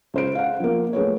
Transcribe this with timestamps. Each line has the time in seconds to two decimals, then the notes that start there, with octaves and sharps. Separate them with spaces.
0.14 C#2 C5 D7
0.35 F5 F#5
0.60 F3 A#3
0.93 A3 G#4 B4 C#5